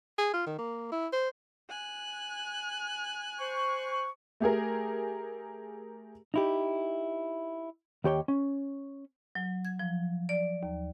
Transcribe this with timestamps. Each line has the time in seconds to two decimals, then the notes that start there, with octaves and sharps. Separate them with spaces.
0.18 G#4
0.34 F4
0.47 D#3
0.59 A#3
0.92 E4
1.13 C5
1.69 G#5 F#6
3.39 C5 C#6
4.40 A3 G4 G#4 A#4
6.34 D#4 E4 G4
8.04 D#2 G4 C#5 G5
8.28 C#4
9.35 F#3
9.65 G#6
9.79 F3
10.29 D5
10.63 D#2